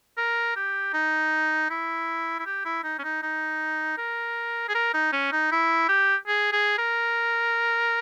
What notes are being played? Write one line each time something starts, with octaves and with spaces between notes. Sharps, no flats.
A#4
G4
D#4
E4
E4
G4
E4
D#4
C#4
D#4
D#4
A#4
G#4
A#4
D#4
C#4
D#4
E4
G4
G#4
G#4
A#4